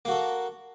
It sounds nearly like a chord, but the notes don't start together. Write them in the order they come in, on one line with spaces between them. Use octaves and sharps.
A#3 F#4 A4